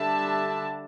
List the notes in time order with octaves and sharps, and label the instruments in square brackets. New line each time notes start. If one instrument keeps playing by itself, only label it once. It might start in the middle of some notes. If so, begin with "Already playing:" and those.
Already playing: [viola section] D3 G3 D4 E5 A5